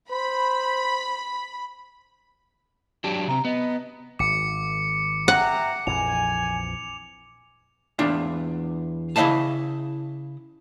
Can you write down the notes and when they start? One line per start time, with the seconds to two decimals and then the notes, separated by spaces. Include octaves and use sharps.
0.11 C5 B5
3.04 F#3 D4 G4
3.28 C3 C4 A#5
3.45 B3 D#5
4.19 G#1 D6 C#7
5.28 E5 F#5 G5 A#5
5.87 A#1 F2 E3 G#5 F7
7.99 E2 D4 F4
9.16 C#3 E4 C5 D#5 F5 A5